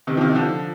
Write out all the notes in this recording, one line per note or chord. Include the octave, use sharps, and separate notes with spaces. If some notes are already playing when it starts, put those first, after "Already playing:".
C3 D#3
F3
C3 D#3
D3 F3